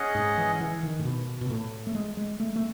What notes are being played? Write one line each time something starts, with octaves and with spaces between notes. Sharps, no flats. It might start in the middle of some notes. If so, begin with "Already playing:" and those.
Already playing: C#4 G#4 D#5 F#5
G#2
E3
E3
D#3
A2
B2
B2
A2
A3
G#3
G#3
A3
A3